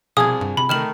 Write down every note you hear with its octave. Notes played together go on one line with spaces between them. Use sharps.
C2 B2 F3 G#4 D#6 G#6
G2
C3 B5
D#3 A3 A#4 F6 E7 F#7